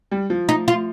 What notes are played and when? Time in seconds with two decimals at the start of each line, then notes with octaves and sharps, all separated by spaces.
0.11 G3
0.30 F3
0.49 D#4
0.68 F4